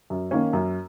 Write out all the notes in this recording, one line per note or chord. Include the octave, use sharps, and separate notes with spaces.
F#2
D#3 A#3 C#4
F#2